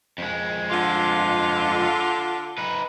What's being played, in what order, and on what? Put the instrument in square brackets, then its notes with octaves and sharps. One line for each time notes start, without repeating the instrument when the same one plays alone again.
[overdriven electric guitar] F2 G#3
[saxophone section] D3 F4
[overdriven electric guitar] D#4 B4